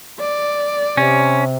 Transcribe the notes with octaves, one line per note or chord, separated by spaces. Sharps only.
D5
C3 C#4